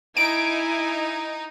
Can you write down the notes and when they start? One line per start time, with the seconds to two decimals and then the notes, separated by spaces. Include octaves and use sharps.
0.17 D#4 E4 G#5 D7